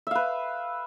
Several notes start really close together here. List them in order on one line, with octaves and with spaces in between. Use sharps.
E5 F5 B4